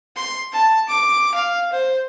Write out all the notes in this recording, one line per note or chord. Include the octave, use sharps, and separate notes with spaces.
C6
A5
D6
F5
C5